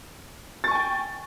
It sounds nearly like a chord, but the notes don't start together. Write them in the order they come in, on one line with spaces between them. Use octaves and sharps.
A6 C#6 G#5 G5